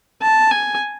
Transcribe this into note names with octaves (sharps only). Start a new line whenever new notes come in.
A5
G#5